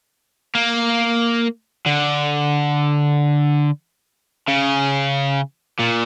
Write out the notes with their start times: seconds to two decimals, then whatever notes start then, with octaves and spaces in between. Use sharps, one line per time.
0.55 A#3
1.86 D3
4.48 C#3
5.79 A#2